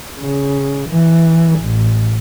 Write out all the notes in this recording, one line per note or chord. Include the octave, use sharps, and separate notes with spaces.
C#3
E3
A1